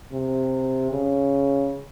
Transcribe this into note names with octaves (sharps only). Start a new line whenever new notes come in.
C3
C#3